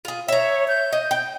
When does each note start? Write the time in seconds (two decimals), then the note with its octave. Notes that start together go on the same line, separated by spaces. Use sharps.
0.05 F4 G#4
0.28 C#5 E5 A#5
0.68 G6
0.93 D#5
1.11 G5